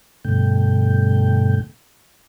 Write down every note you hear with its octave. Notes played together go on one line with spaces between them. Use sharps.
G2 B2 D3 A3 G5